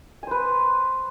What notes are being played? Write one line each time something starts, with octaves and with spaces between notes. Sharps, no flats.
B4 C5 G#5